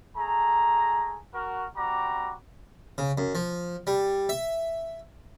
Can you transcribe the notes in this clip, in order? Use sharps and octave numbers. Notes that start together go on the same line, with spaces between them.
A3 G#4 A#5
F#4 A#4
G3 C4 F#4 A#5 D6
C#3
F#2
F3
G3
E5